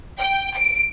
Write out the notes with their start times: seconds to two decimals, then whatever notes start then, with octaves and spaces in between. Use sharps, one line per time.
0.19 G5
0.55 D7